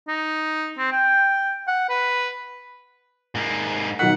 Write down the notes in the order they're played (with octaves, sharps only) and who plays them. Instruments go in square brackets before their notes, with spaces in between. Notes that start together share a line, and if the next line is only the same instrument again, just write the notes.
[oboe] D#4
C4
G5
F#5
B4
[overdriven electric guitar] G#2 A#3
[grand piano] B1 D#3 B6 [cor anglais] F#5